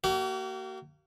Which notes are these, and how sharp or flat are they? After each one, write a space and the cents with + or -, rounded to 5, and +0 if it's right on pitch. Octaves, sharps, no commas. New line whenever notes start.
A#3 -25 F#4 +45